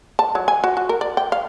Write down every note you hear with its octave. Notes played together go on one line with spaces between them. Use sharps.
A5
F#3
G#5
F#4
F#4
A#4
D5
G5
F5